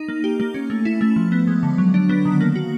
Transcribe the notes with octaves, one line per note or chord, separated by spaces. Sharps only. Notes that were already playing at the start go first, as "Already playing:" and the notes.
Already playing: D#4
A#3
G4
A#3
C#4
A3
E4
A3
F3
B3
G#3
D3
F#3
D4
B3
D#3
A#3
F#4